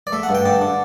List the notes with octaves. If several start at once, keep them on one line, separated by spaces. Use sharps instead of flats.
D5
A3 E5
F#5
G2
G5
D3 A5
D3